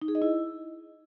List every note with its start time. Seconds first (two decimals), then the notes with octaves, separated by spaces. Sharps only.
0.02 D#4
0.08 G#4
0.15 D#5
0.22 E4